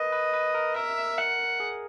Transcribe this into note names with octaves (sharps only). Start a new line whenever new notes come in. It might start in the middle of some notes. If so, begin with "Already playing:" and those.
Already playing: A#4 B4 D#5
B4
B4
A#4
A#4 E5
F#5
G#4